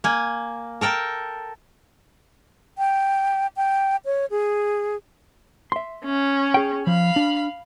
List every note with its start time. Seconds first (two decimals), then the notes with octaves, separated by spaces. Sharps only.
0.04 A#3 G#5
0.81 A4 A#4 G5 A5
2.78 G5
3.57 G5
4.05 C#5
4.31 G#4
5.72 E5 C6
6.05 C#4
6.54 G#4 G5
6.87 F3 F5 B5
7.16 D4